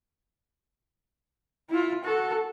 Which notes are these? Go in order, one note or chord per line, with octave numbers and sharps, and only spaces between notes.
E4 F4
F#4 A4